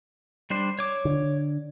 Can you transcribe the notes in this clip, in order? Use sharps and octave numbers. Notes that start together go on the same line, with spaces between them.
G3 D4 C5
C#5 D6
D3